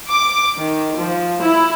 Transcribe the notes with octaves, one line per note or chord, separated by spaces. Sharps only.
D6
D#3
F3
E4